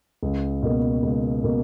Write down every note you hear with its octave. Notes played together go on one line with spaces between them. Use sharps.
C#2
B2 A#3
C#2
B2 A#3